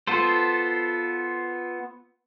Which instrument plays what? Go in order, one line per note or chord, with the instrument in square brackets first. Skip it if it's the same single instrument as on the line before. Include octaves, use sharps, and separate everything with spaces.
[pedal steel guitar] B3 F4 A4 C5